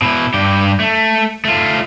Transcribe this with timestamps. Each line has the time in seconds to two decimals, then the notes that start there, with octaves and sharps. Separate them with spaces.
0.02 B2 E4
0.34 G2 G4
0.80 A3
1.45 A3 F4